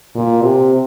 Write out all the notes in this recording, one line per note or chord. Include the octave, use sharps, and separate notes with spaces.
A#2
C3